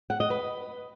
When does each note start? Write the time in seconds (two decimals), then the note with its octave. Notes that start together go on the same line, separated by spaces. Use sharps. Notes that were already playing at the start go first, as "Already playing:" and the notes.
0.10 F#5
0.20 D#5
0.30 B4